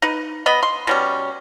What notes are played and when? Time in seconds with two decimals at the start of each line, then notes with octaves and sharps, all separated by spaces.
0.02 D#4 B4
0.46 B3 D#5 B5
0.63 C6
0.87 B2 G3 C#4